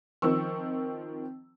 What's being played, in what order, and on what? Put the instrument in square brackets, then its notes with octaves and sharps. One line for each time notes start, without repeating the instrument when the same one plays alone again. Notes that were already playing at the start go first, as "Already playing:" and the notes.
[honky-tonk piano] D#3 F3 C4 C#6 E6